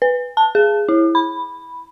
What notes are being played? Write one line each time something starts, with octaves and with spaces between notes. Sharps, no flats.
B4
A5
G#4
E4
B5